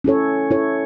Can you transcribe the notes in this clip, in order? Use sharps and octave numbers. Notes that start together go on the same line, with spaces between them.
C#4 E4 A4 C#5
C#4 E4 A4 C#5